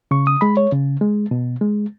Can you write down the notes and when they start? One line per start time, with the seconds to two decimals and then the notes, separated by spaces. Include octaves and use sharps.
0.11 C#3 C#6
0.27 D#6
0.41 G#3 B5
0.57 C#5
0.72 C#3
1.01 G#3
1.31 B2
1.61 G#3